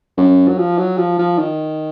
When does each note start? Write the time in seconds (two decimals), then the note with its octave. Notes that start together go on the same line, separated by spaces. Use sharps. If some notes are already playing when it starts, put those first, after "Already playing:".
0.17 F#2
0.48 F#3
0.58 F3
0.78 F#3
0.98 F3
1.19 F3
1.38 D#3